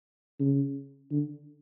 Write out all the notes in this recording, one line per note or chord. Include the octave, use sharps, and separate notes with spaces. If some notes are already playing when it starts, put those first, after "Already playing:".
C#3
D3